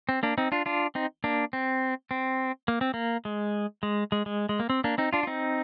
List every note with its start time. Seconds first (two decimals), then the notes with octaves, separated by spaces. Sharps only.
0.09 C4
0.23 A#3 D4
0.38 C4 D#4
0.52 D4 F4
0.66 D4 F4
0.95 C4 D#4
1.24 A#3 D4
1.53 C4
2.11 C4
2.68 A#3
2.81 C4
2.94 A#3
3.25 G#3
3.83 G#3
4.12 G#3
4.26 G#3
4.49 G#3
4.60 A#3
4.70 C4
4.84 A#3 D4
4.98 C4 D#4
5.13 D4 F4
5.23 F4
5.27 C4 D#4